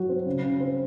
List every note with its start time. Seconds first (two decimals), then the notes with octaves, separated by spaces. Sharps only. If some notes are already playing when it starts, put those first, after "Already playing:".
Already playing: F#3 F#4
0.09 C4
0.26 C#3
0.44 C#3
0.60 C4